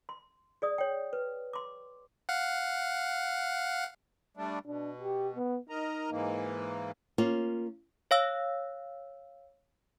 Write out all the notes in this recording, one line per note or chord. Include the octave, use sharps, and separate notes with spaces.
C6
G#4 D5 D#6
C#5 G5
B4
C6 D6
F5 F#5
G3 A3 D4
B2 D4
G4
B3
D#4 A#4 D#5 A#5
G#2 E3 A#3
A#3 C#4 F4
C#5 F5 E6